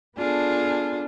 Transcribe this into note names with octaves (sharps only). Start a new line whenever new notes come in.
B3 D4 F4 G#4 A4